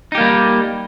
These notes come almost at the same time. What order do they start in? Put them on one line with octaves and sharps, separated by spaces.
D#4 G4 A#3 G3